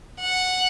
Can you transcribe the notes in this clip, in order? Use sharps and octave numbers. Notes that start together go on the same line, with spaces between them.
F#5